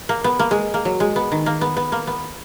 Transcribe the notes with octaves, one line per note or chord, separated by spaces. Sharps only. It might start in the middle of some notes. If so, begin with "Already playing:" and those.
A#3
B3
A#3
G#3
A#3
F#3
G#3
B3
D#3
A#3
B3
B3
A#3
B3